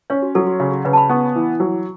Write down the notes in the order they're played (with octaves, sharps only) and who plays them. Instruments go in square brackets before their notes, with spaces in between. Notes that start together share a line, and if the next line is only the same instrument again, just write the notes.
[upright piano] C#4 [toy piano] C#5
[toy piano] F#4
[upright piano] F#3 [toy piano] A4
[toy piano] F#4
[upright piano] C#3 [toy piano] F#4
[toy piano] F#4
[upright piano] C#3 [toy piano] B4
[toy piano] A5
B5
[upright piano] B3 [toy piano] C#6
[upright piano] E3
F#3